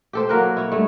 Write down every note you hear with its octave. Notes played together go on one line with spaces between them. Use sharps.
G4 A4 C5
F#3 A#3 A#4 B4
E4 C#5
G2 A3